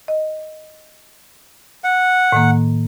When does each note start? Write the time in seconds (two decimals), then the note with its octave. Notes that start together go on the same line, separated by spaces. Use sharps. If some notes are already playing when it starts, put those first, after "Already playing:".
0.08 D#5
1.84 F#5
2.32 A2 D#3 A#3